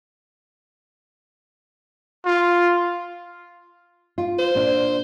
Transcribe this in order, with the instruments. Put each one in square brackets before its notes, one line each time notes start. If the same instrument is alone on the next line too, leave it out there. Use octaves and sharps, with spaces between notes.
[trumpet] F4
[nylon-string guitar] F4
[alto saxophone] C5
[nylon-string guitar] A#2 D4